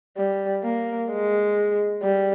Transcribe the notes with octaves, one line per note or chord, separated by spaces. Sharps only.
G3
A#3
G#3
G3